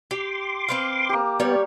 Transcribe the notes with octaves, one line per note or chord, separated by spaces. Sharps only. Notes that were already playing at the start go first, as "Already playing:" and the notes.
G4 C6 D6
C4 B4 F5
A#3 G4
G3 B3 C#5 D5 G5